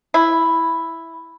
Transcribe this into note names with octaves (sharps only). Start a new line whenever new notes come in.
E4